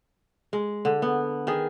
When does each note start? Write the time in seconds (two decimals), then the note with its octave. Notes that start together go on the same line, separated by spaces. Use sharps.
0.53 G#3
0.85 D3
1.02 B3
1.47 D#3 G#4